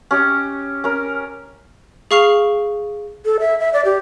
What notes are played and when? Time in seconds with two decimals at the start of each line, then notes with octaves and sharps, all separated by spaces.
0.11 C#4 G4 D#5
0.84 C#4 A#4
2.11 G#4 F5 C#6 F6 C7 F7
3.25 A4
3.40 E5
3.59 E5
3.73 D5
3.85 G4